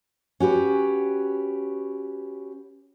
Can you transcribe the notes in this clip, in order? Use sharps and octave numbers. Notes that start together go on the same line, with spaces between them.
C#4 F#4 G4 B4